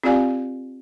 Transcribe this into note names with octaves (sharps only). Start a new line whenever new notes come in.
C4 F4 G4 D5 F5 G#5